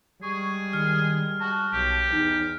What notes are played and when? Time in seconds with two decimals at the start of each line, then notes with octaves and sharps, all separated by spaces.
0.23 G3 G#3 G#4 C#6
0.73 D#3 F6
1.40 F#4 A5
1.73 B1 G4
2.12 E2 D#4